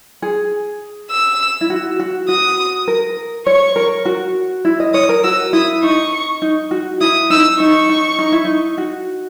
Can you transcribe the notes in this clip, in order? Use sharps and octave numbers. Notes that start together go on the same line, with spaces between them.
G#4
E6
E4
F#4
F#4
F#4 D#6
A#4
C#5 C#6
A#4
F#4
E4
D#5
C#5 D#6
A#4
F#4 E6
E4 D#6
D#4 C#6
D#4
F#4
E4 D#6
D#4 E6
D#4 C#6
D#4
D#4
E4
D#4
F#4